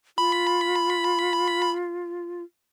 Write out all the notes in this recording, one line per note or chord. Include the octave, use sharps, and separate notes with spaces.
F4 B5